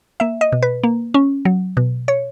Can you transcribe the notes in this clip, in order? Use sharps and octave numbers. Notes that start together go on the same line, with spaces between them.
A#3 E5
D#5
B2
B4
A#3
C#4
F#3
B2
C#5